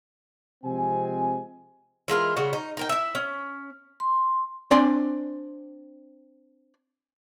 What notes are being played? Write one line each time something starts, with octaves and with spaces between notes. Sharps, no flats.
C3 F3 G#3 C4 G#5
E3 G#3 F4 A#4
C#3 G3 F#4
D#4
D#4 A#4 G5
E4 E5
C#4
C6
C4 D4 D5 G#5 C6